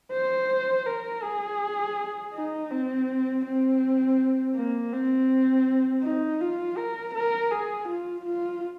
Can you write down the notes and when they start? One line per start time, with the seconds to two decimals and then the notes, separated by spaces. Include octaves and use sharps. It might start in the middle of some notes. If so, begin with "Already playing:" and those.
0.12 C5
0.86 A#4
1.23 G#4
2.34 D#4
2.70 C4
3.45 C4
4.55 A#3
4.93 C4
6.03 D#4
6.41 F4
6.77 A#4
7.14 A#4
7.51 G#4
7.88 F4
8.25 F4